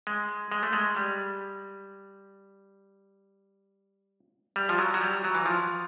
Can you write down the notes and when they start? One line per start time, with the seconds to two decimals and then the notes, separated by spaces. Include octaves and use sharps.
0.07 G#3
0.52 G#3
0.63 A3
0.73 G#3
0.96 G3
4.56 G3
4.69 F3
4.78 F#3
4.94 F#3
5.01 G3
5.24 F#3
5.35 E3
5.46 F3